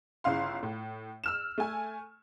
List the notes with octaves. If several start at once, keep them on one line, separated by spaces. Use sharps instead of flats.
G1 C#3 E4 F5 C6
A2
E6 F6 E7
A3 G#5